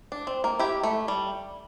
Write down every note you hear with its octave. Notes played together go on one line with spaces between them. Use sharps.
D4
C4
A#3
E4 G4
A3
G3